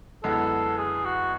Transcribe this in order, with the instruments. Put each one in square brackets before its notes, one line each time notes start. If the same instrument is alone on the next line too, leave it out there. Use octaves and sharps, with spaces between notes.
[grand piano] F#2 D3 G#3 B3 E4 [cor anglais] A4
[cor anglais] G#4
F#4